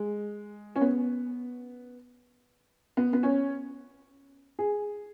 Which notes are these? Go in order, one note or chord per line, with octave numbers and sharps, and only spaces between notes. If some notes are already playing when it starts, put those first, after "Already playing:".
Already playing: G#3
C#4
B3
B3
B3
C#4
G#4